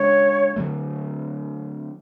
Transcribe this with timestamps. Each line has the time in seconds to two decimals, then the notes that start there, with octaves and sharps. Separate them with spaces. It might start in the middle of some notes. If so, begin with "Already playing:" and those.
Already playing: C#3 G#3 D4 C#5
0.56 D3 F#3 A3